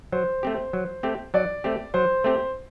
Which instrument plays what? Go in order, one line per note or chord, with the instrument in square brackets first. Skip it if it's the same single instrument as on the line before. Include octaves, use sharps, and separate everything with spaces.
[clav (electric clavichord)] F#3 [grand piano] C5
[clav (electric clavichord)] A3 C4 G4
F#3
A3 C4 G4
[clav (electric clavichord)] F#3 [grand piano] D5
[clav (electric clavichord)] A3 C4 G4
[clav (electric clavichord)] F#3 [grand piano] C5
[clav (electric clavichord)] A3 C4 G4